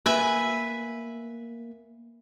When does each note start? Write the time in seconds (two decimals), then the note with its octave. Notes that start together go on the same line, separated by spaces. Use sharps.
0.06 A#3 B4 E5 G#5